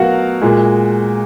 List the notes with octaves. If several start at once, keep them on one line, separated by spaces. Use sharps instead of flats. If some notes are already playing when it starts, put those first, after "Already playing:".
Already playing: B2 F#3 F#4 A#4 F5 F#5
A#2 G#3